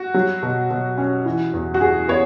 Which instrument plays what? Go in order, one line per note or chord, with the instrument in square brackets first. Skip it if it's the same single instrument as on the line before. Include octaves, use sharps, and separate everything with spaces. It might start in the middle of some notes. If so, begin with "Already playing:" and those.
Already playing: [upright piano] F#4
F#3
B2
B2
C#4
E3
E2
F#4
E2 G#4
B3 C#5